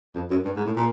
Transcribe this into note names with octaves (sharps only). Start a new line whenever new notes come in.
F2
F#2
G2
G#2
A2
A#2